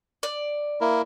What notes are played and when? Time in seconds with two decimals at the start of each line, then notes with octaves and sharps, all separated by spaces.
0.23 D5
0.81 A#3 E4 A#4